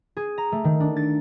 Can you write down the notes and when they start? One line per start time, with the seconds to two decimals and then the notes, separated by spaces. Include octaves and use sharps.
0.17 G#4
0.38 A#5
0.52 A3
0.64 D#3
0.80 D4
0.97 A6